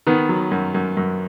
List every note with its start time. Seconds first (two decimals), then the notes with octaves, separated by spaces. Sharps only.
0.07 D#3 B3 B4
0.29 F#3
0.51 F#2
0.74 F#2
0.97 F#2